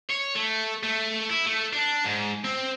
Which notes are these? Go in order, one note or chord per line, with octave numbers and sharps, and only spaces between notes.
C#5
A3
A3
E4
A3
D4
G#2
C4